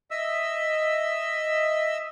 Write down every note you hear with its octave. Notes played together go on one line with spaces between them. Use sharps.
D#5 E5 E6